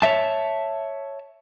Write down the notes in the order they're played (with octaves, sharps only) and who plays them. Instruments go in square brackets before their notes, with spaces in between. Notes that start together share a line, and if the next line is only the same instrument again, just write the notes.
[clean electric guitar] C#5 D#5 E5 A5